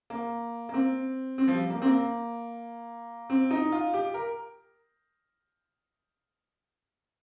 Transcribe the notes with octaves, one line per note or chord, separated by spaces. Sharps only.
A#3
A#3
C4
C4
F3
G3
A#3
C4
A#3
C4
D#4
F4
G4
A#4